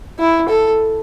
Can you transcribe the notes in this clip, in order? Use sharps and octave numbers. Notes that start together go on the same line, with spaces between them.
E4
A4